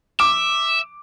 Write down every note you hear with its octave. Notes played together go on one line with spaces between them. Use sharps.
E5 D6